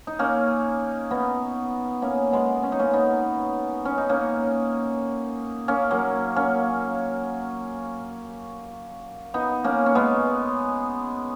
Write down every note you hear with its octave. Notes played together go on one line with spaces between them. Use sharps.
D#4
A#3 C#4
B3 D#4
A#3 C#4
G#3 B3
C#4
D#4
A#3 C#4
B3 D#4
C#4
D#4
A#3 C#4
A#3 C#4
F#3 A#3
A#3 C#4
B3 D#4
A#3 C#4
C#4
G#3 B3